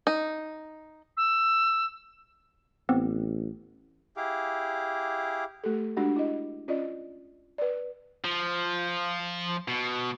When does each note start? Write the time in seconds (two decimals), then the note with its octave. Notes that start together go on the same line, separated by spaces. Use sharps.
0.07 D#4
1.17 E6
2.89 A1 B3 C4
4.17 E4 G4 G#4 F5 D6
5.64 A3 G4 A4
5.97 G#3 D4 F#4 G4 F#5
6.16 E4 D#5
6.68 C#4 F4 D5 D#5
7.58 B4 D5
8.24 F3
9.68 B2